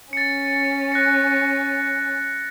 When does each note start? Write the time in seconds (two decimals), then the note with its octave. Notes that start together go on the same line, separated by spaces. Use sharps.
0.13 C#4 A6 C#7
0.92 F#6 A#6 C#7